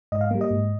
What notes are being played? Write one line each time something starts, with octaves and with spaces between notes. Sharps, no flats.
G#2 D#5
F5
G3 A#3
D#5
G#2